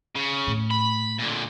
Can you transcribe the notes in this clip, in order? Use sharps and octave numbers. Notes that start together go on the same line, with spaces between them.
C#3
A2
B5
A#2 D3